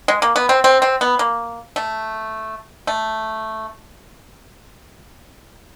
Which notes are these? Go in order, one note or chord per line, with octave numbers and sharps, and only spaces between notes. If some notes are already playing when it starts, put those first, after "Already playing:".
G#3
A#3
B3
C4
C4
C4
B3
A#3
A3
A3